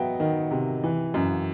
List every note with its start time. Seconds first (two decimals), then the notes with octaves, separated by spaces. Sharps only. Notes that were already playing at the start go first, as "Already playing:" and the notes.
Already playing: F#3 B3 D#5 E5 F#5 G5
0.20 D#3
0.51 C3
0.84 E3
1.14 F#2